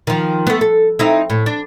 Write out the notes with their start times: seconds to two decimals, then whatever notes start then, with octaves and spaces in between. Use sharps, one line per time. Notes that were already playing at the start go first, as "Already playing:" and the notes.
0.07 D#3 F3
0.47 A3 B3
0.61 A4
0.99 C4 D#4 E4
1.30 A2
1.46 D4